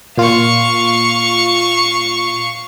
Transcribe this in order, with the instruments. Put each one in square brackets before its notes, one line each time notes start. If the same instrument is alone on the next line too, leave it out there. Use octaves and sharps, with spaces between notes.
[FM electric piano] A#2 F4 [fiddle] F5 C#6